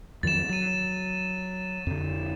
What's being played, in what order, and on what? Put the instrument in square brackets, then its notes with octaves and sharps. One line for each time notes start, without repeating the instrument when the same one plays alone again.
[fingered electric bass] F2 D#3 F#3 [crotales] A6 E7
[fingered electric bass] F#3 [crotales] A6 D#7
[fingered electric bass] F2 D3